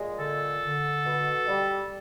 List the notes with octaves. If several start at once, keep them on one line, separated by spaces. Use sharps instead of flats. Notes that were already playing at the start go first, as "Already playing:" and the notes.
Already playing: A#2 G#3
D3 A4
D3
B2
G3